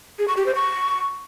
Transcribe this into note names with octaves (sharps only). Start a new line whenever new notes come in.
G#4
C#6
G4
C5
C#6